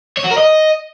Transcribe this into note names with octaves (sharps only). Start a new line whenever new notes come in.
C#5
F#4
A#4
D#5